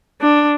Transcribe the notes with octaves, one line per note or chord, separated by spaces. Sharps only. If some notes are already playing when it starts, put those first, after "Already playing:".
D4